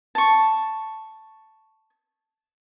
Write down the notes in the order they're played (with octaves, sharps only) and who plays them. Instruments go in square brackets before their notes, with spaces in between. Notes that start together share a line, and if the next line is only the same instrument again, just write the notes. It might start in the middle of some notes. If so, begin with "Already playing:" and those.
[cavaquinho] A5 C#6